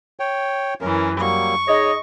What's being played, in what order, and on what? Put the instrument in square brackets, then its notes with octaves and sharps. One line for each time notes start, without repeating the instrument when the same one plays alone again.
[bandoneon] C#5 G5
[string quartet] F#2 E3 [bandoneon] C#4 A#4
[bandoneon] F#3 G3 A#3 [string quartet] C#6
[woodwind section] D#4 G#4 D#5 [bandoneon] C#5